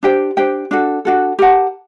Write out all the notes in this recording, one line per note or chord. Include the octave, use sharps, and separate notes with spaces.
D4 G4 C5 G5
D4 G4 C5 G5
D4 F#4 A4
D4 F#4 A4
G4 A#4 F#5 A5